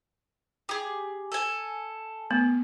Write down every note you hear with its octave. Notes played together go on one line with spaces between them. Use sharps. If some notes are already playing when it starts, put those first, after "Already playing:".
G4 G#4
A4 G#5
A3 B3